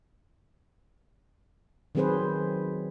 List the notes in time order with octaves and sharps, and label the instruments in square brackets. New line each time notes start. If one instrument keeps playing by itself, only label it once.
[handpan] D#3 F#3 C4 G#4 B4 C5